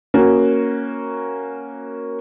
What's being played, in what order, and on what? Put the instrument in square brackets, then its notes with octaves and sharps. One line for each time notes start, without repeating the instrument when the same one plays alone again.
[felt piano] A#3 C#4 F#4